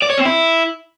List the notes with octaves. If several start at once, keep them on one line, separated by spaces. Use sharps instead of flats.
D5
C#5
C4
E4